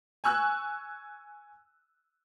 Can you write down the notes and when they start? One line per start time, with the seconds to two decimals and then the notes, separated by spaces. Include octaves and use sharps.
0.24 G#5 C#6 E6 F#6